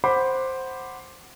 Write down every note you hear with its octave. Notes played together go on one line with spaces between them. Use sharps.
C5 F#5 B5 D6